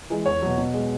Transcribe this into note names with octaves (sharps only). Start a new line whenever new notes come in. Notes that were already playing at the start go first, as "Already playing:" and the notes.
E3 G#3
E2 C#5
B2 F#3
B2
G#3